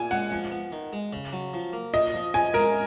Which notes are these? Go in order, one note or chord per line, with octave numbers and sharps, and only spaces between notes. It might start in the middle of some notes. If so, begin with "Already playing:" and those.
Already playing: A#2 G#5
G#3 F#5
F3
B3
D#3
G#3
C#3
F#3
F3
A#3
A#2 D#5
F3
F3 G#5
G#3 A#4